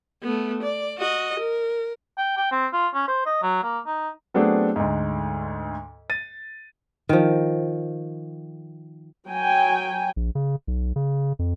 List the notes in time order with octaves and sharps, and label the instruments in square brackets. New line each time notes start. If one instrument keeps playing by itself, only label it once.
[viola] A3 B3
D5
F#4 D#5
A#4
[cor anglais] G5
G5
C4
F4
C#4
C5
D#5
F#3
A#3
D#4
[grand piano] F#3 A3 B3 C4 D4 G#4
D2 G#2
A6 D#7
[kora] D#3 F3
[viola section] F#3 G5 G#5
[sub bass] A#1
C#3
B1
C#3
F2